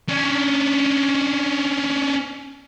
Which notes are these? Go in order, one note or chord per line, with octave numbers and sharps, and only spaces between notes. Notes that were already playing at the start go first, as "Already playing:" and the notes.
C#4 D4